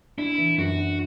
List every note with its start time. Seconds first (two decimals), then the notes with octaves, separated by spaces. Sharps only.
0.18 D4 E4
0.38 E3
0.58 F#2 F#4
0.78 D4